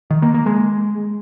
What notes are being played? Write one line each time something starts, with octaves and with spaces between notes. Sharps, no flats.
D#3
A#3
A#3
G#3